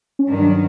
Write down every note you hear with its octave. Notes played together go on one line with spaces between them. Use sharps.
C#4
G2 D#3 F#3 D4